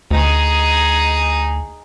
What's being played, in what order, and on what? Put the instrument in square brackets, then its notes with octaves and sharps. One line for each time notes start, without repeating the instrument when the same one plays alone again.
[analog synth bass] D2 [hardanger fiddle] D#4 G#4